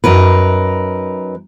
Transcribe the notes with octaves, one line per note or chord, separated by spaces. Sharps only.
F#2 D#4 A#4 B4